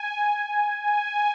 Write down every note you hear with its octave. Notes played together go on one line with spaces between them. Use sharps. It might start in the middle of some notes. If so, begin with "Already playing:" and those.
Already playing: G#5
G#5